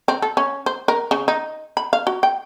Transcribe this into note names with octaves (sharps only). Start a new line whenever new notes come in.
C4
A4
C#4
C5
A#4
C#3
D#4
B5
F5
F#4
G5